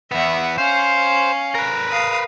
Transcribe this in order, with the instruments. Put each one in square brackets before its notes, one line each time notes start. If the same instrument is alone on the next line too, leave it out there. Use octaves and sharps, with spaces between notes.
[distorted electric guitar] E2 B3 [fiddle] E5 F#5
[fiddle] C#4 F5 [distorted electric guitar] C5
[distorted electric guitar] A#4 B4
[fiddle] F5 D#6